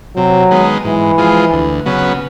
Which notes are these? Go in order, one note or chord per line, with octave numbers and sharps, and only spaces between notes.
C3 F#3
D#3 G#3 B3
G#2 E3
F3 G#3
D2
C#3 F#3 B3